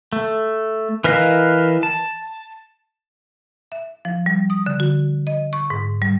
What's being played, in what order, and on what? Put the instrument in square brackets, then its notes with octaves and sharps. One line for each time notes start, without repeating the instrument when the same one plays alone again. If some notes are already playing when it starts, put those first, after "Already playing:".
[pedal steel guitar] A3
E3 A#4 B4 D#5 F5
A5
[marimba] E5
F3
G3
D#6
D3
F#4
D#5
C#6
G#2
G3